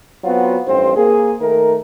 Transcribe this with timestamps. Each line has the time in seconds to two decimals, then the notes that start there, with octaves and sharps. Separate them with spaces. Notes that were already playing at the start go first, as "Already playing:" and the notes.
0.24 F#3 B3 C4 F4 F#4
0.66 A1 G2 C4 C5
0.96 A#3 G#4
1.40 D#3 A3 A#4